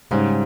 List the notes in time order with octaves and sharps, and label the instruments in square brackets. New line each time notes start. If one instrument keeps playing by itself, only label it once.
[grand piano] G#2 [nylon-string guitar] C#3 G3 C#4